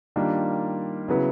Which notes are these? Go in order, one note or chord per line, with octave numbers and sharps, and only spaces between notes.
D#3 G3 A#3 D4 F4
C#3 F#3 B3 E4